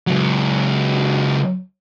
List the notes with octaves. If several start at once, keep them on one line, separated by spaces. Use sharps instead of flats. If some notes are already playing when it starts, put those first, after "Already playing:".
C#2 F#3